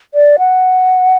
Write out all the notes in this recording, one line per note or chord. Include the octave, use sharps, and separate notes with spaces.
D5
F#5